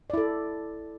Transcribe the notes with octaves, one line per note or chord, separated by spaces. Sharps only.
E4 A4 D5